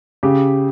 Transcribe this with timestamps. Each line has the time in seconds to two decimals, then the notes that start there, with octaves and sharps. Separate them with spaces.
0.23 C#3 G4